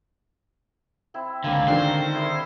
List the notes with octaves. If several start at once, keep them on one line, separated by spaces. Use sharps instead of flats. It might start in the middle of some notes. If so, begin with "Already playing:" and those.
C4 E4
C#2 D3 A#3 C4
D3 D#3 C5
E4 G#4